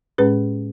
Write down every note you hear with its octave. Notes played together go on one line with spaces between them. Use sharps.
A2 G#3 C#4 G#4 B4